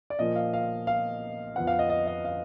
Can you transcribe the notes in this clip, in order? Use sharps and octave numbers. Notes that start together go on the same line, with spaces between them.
D5
A#2 F3 A#3 D#5
F5
F5
F5
F2 F3 B3 F#5
F5
D#5
D#5
D#5
F5